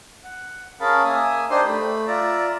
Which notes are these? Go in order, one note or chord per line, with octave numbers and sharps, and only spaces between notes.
F#5
C#4 G#4 A#4 F5 A5 B5
A#3 E5 G#5 D#6
D4 D#4 G4 C5 D#5 C6
A3 B5
F4 D5 E5 A#5